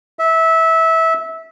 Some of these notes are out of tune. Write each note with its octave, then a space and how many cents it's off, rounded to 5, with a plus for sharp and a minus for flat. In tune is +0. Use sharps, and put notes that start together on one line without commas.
E5 -20